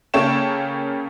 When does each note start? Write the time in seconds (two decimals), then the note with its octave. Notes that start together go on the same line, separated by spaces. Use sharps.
0.14 C#3 A#3 A4 C#5 G5 E7